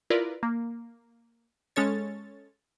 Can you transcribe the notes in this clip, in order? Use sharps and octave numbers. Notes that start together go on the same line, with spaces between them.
E4 F4 A#4 B4 D5
A#3
G#3 C#4 A4 C#5 A6